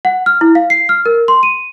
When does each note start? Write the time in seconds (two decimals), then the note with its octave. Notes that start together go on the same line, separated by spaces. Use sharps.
0.05 F#5
0.26 F6
0.41 E4
0.55 F5
0.70 C7
0.89 F6
1.06 A#4
1.28 C6
1.43 D#7